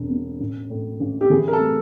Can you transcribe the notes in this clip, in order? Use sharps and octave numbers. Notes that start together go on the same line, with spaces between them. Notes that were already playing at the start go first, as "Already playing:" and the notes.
Already playing: E1
B2
A1
A2
A1
G4
E3 G#4
A#4
A4
A3